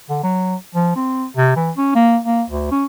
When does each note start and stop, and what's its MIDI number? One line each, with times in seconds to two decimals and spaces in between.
0.10 0.19 50
0.23 0.55 54
0.75 0.93 53
0.96 1.27 60
1.37 1.55 48
1.56 1.71 52
1.77 1.93 61
1.95 2.18 58
2.24 2.43 58
2.50 2.69 38
2.71 2.86 61